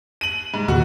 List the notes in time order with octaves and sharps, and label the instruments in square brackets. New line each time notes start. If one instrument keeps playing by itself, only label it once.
[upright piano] D#7 F#7
G#2
[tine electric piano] D#2 A#2 [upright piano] F#4